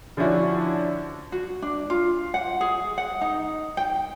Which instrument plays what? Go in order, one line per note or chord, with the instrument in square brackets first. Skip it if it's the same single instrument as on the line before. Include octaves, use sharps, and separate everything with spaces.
[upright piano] D3 F3 C#4 D4 E4 F#4
[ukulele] F#4
D4
F4
F#5
G#4
F#5
D#4
G5